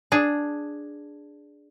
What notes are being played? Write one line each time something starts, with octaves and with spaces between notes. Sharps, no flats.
D4 G#4